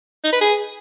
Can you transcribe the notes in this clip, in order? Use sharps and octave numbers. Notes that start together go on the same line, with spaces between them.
D#4
B4
G#4